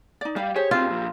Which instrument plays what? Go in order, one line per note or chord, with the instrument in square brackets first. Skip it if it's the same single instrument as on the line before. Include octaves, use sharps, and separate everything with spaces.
[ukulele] D#4 D5
[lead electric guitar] G3 [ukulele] F5
[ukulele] G4 G#4 C5 [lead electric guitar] C#5
[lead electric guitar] C#2 C4 [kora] F4
[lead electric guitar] A#2 F3